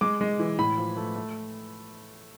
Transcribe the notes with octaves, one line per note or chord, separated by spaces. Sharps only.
G#3 D6
G#3
E3
A2 B5
F3
A3
A3